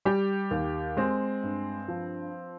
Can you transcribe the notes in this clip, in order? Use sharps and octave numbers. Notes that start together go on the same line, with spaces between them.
G3 G4
D#2
G#3 C4
G2
F3